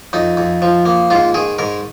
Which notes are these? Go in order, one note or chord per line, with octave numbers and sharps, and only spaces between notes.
F2 D#4
F2
F3
A#3
G#2 F4
D#3 G#4
G#2 A#4